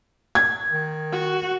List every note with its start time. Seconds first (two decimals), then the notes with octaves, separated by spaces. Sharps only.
0.35 G#6
0.72 D#3
1.12 F#4